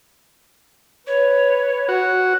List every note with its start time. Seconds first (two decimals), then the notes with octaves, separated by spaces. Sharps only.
1.07 B4 C#5
1.88 F#4